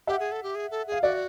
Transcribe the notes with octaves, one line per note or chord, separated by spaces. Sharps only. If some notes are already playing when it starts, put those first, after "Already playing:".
G4 E5 F#5
G#4
A4
G4
G#4
A4
G#4 F5
F#4 D5 E5